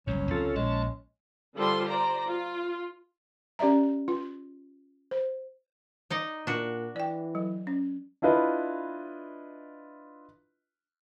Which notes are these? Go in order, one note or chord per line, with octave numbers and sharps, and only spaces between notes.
F#1 C2 G2 F#3 C#4
C#2 F3 C4 F4 A4
A#1 G#3 A5
D3 G3 F4 A4 C5 C6
C5 D5 A#5
F4
C#4 G4 D5 E5 A#5
F4
C5
D#4 D5 D#5
A#2 D4 F#4
E3 D5 G5
F#3
C#4
D4 E4 F4 B4 D#5